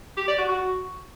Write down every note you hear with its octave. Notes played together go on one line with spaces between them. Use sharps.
G4
D5
F#4
F#4